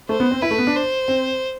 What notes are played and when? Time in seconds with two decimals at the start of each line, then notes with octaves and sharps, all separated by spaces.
0.09 A3 C5
0.20 B3
0.31 C4
0.42 E4 B4
0.51 A3
0.58 B3
0.67 D4
0.76 C5
1.08 C4